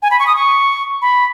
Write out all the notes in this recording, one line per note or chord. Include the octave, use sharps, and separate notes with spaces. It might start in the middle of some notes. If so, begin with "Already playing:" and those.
G#5
B5
C#6
D#6
C#6
B5